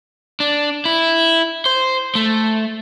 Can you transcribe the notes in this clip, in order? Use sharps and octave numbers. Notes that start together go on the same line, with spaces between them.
D4
E4
C5
A3